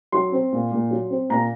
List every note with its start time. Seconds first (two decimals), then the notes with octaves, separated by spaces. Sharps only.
0.12 F#3 C6
0.32 C4
0.52 A#2
0.71 A#2
0.91 F#3
1.10 C4
1.29 A#2 A#5